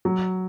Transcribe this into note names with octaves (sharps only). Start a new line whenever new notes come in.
F#3